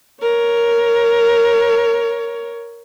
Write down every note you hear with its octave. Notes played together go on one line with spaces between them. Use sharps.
A#4 C#5